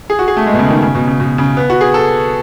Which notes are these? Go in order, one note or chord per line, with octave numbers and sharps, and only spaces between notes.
G#4
F#4
G#4
A3
G#3
B2
C#3
D#3
C#3
B2
C#3
B2
C#3
B3
F#4
G#4
A4